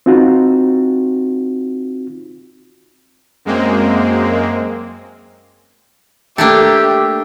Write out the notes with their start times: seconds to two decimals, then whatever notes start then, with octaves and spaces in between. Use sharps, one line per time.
0.06 C4 D#4 F4 F#4
3.45 F#2 G#3 A#3 C4
6.38 A3 A#3 D4 G4 E5